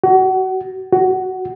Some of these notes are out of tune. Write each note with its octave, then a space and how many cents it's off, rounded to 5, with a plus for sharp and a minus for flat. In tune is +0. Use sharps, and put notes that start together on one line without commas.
F#4 +25
F#4 +10